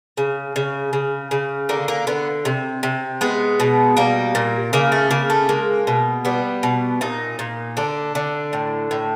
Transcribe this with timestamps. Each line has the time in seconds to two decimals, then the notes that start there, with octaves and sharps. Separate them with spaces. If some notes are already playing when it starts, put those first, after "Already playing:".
0.17 C#3
0.56 C#3
0.93 C#3
1.31 C#3
1.69 D3 A#3
1.88 A#3
2.07 D3 B3
2.45 C3
2.83 C3
3.21 G#3 B3
3.60 B2
3.97 G3 A#3
4.35 A#2
4.73 C#3 A#3
4.92 A3
5.11 C#3 A#3
5.30 A3
5.49 G#3 A#3
5.87 B2
6.25 G3 B3
6.63 B2
7.01 A#2 D#4
7.39 A#2
7.77 D3 D4
8.15 D3
8.53 A2
8.91 A2